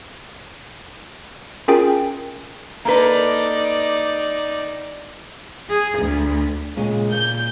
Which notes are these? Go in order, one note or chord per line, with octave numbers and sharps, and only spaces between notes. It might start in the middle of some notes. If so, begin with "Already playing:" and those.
C#4 F4 G#4 A#4 G5
A#3 D#4 A4 B4 D5
G#4
D2
A#2 C#3 G#3
A#2 A#3 G6